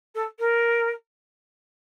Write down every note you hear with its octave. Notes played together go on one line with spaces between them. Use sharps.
A4
A#4